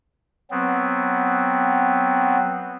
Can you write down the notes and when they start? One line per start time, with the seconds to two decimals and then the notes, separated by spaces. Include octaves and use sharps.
0.51 F#3 B3 C4